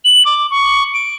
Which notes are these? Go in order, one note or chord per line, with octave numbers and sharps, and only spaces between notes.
F#7
D6
C#6
D7